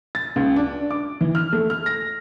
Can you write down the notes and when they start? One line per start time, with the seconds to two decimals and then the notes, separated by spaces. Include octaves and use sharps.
0.15 A6
0.36 C#2
0.56 D4
0.91 D6
1.21 E3
1.35 F6
1.53 A3
1.70 F6
1.86 A#6